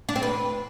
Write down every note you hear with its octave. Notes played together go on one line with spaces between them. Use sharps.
D4
C4
B4